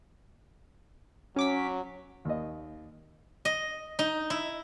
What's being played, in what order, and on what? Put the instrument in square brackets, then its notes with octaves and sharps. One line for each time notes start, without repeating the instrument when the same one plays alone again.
[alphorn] F#3 [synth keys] C#4 D6 B6
[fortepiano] D#2 D#5
[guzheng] D#5
D#4
E4